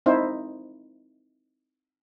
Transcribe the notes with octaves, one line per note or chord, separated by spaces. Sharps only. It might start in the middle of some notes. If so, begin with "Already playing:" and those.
C4 D#4 E4 C5